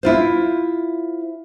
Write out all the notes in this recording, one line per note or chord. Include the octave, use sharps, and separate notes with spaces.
E4 F4 C5